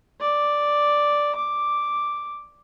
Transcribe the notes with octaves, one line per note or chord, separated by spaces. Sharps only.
D5
D6